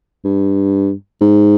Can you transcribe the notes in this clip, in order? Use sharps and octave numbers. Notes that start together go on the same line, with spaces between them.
G2
G#2